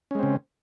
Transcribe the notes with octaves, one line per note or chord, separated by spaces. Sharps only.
C#3 G#3 C4 C#4